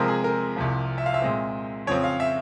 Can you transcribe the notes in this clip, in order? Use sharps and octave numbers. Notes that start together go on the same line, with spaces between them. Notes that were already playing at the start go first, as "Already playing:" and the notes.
Already playing: C3 F3 G#3 C4 A#4
G#4
A#4
C2 C3 F3
E5
F5
E5
A#2 G#3 C4
F2 C#3 F3 C4 C#5
F5
E5